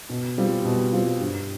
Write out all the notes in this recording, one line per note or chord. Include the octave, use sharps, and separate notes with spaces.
B2
G3 C4 F4
B2
G3 C4 F4
G2